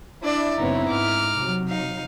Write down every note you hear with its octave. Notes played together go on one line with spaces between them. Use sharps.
D4 E4 D5
F#1 B3 C4 D#4 B4 C#5
G#2 D6 F6
C3 F#3
D#4 F5